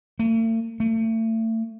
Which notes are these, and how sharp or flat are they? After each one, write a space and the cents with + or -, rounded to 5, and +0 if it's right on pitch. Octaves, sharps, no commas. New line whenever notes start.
A3 +45
A3 +35